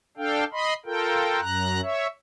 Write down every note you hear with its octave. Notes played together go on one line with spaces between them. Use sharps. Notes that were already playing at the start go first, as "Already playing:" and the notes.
D4 A4 F5 G5
D#5 B5 C6
F4 A4 A#4 G5
F#2 A#5 F#6
C#5 E5